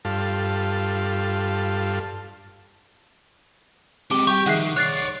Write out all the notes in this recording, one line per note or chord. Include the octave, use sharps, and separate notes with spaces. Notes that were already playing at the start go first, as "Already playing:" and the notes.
G2 F4 A4
G#3 C4 G4 D6 G7
G3 G4 G5 C#6 G6
D#3 F3 G#4 E5 F#5 F#6 C7
C#5 D5 F#6 A6 C7